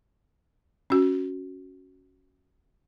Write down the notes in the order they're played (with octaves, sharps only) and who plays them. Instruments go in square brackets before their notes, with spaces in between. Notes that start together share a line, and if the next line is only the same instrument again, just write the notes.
[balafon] C#4 F#4